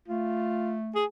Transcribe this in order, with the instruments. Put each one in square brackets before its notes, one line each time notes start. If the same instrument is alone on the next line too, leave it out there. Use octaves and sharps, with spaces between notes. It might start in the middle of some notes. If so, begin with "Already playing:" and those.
[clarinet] A3 [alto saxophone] F4
[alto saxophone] G#4